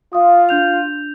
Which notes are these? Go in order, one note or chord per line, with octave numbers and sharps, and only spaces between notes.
F4 F5 D#6
D4 G6 F7